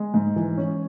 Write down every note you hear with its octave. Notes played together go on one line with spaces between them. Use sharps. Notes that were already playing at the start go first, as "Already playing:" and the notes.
Already playing: G#3
G#2
E3
C#4